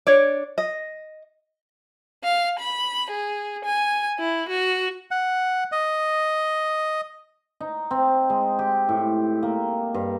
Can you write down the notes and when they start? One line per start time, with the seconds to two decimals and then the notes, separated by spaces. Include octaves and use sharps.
0.07 D4 C#5 D5
0.58 D#5
2.25 F5
2.61 B5
3.12 G#4
3.66 G#5
4.19 E4
4.49 F#4
5.11 F#5
5.72 D#5
7.60 D#4
7.91 C4
8.30 G#3
8.59 G4
8.89 A2
9.43 A#3
9.94 G2